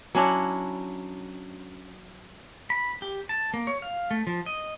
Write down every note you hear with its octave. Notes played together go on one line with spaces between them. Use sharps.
F#3 C#4 D4 E4
B5
G4
A5
A#3
C#5
F5
A3
F3
D#5